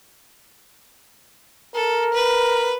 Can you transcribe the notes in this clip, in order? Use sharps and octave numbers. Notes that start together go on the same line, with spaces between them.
A4 A#4
B4